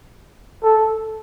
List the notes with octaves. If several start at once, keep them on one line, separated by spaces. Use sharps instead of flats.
A4